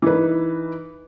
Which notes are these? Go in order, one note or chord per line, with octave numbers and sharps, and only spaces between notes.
E3 D#4 B4